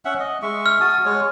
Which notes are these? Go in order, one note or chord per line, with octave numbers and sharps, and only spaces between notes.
C#4 E5 F#5
D#5
G#3 E5 C#6
F6
F#4 A5 D#6
G#3 C#5